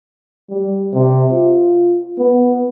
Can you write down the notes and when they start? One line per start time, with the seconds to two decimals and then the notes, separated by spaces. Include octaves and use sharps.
0.50 G3
0.93 C3
1.32 F4
2.18 B3